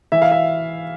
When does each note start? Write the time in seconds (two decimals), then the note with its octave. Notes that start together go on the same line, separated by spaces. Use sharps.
0.12 E3 E5
0.22 F5
0.31 E5